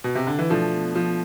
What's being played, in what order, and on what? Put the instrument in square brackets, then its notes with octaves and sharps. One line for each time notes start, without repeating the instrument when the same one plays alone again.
[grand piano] B2
C3
D3
E3
[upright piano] B2 A3 D4 [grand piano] F3
[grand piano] F3